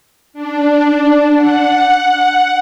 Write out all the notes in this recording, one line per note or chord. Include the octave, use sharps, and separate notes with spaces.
D4
F#5